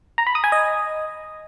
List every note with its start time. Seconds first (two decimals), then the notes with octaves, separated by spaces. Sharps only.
0.18 A#5
0.27 B5
0.35 D#6
0.44 G#5
0.52 D#5